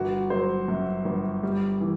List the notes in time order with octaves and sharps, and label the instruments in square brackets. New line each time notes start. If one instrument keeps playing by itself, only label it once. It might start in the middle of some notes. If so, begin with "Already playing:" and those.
Already playing: [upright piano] G1 F#4
F#3 C5
F#2
G1
G3
E3